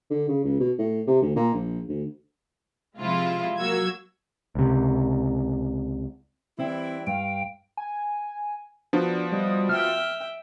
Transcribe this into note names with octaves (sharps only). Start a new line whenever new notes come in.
D3
C#3
C#2
B2
A2
C3
D2
A#2
A#1
D2
C3 F3 G#3 C4 E4 F4
F#3 A#3 F#4 E6 G#6
C#2 C3
E3 G3 C4 E4 G5
G2 F5 G5
G#5
F3 B3 D4 F#4
G3 D#5
E5 G5 F6